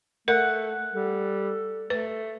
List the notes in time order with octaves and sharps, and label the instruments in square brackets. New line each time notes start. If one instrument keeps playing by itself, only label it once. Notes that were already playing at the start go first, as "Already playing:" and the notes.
[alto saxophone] A3 [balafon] A#4 [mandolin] F#5
[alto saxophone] G3 [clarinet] A4
[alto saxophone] A3 [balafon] B4